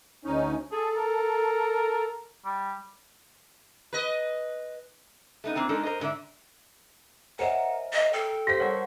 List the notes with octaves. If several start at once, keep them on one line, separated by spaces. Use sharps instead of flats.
D2 C#4 D#4
G#4 A4
A#4
G3
B4 D#5
A3 B3 D#4
E3 A#3 C4 D4
G#3 D4 D#4 A4 A#4
A#4 C5 D#5
G#2 D3 D5 E5
A#4 C5 C#5 D#5 E5 F#5 G#5 E7
D#5
A4 G5 F6
G4 C5 F5 C6 A#6 B6
G3 A#4 C#5 F#5 A5 C#6 G#6